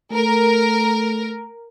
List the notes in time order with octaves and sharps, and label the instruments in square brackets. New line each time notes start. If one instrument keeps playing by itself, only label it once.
[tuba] A3 [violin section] A#4